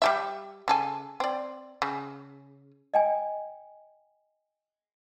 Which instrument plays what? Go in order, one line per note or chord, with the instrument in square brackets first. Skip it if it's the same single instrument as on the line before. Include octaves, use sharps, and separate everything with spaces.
[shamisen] G3 G4 E5
C#3 A4 G#5
C4 D5
C#3
[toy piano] D#5 G5 G#5